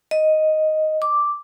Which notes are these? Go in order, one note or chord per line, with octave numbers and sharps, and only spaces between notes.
D#5
D6